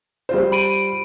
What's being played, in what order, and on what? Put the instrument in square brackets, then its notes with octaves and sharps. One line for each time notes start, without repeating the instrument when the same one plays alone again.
[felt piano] G3 F4 C5
[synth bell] B5 D7 D#7